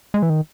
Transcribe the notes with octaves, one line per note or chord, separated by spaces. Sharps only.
G#3
E3
D#3